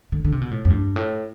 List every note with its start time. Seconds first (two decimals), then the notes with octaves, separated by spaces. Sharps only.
0.12 D3
0.25 D3
0.32 C3
0.41 B2
0.51 A2
0.65 F2
0.70 G2
0.96 A2